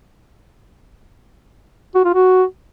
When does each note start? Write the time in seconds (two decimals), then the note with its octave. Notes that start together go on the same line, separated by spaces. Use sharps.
1.95 F#4
2.05 F4
2.14 F#4